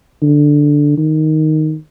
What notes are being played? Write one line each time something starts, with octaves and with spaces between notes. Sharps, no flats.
D3
D#3